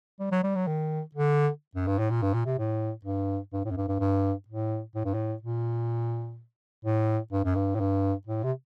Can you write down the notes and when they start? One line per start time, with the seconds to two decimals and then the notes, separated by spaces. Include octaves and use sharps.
0.20 G3
0.32 F#3
0.44 G3
0.55 F#3
0.67 D#3
1.15 D3
1.75 F#2
1.87 G2
1.99 A2
2.10 A#2
2.22 G2
2.34 A#2
2.46 C3
2.58 A2
3.05 G2
3.53 G2
3.65 A2
3.71 F#2
3.77 G2
3.88 G2
4.00 G2
4.48 A2
4.95 A2
5.05 G2
5.14 A2
5.42 A#2
6.85 A2
7.32 G2
7.44 F#2
7.55 G2
7.75 A2
7.80 G2
8.27 A2
8.44 C3